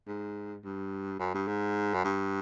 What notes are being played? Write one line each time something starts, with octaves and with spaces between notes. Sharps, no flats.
G#2
G2
F#2
G2
G#2
F#2
G2